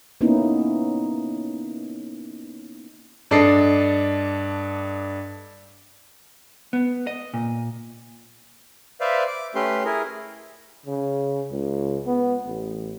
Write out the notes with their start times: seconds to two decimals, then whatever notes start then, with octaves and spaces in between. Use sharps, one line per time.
0.21 A#3 B3 C#4 D#4 E4
3.31 G2 D4 A4 D#5 C7
6.73 B3
7.07 D#5
7.34 A#2
9.01 B4 C5 D5 E5 F5
9.28 D6
9.55 A3 C#4 G4 B4 C6
9.85 E4 G#4 A#4
10.86 C#3
11.51 C#2
12.06 B3
12.47 A1